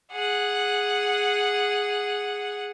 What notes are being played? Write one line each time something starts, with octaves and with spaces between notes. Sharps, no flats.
G#4 F#5